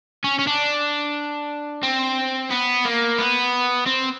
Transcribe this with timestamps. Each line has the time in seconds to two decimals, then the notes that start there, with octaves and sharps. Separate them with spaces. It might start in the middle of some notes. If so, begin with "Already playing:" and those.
0.24 C#4
0.39 C#4
0.47 D4
1.83 C4
2.50 B3
2.85 A#3
3.18 B3
3.87 C4